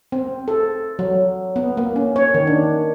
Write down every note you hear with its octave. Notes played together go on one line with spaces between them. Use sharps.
C4
A4
F#3
B3
A#3
C#4
C#5
D#3
D4